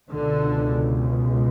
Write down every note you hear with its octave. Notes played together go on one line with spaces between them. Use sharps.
C#2 B2 D3